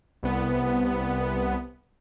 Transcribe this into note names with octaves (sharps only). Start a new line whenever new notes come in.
C2 B3